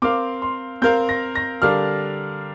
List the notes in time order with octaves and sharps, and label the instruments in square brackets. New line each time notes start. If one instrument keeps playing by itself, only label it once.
[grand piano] C4 A#4 F5 [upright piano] D6
[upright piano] C6
[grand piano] C4 A#4 F5 [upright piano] G6
[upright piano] A#6
A#6
[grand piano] D3 G3 D4 A#4 F5 [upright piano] F6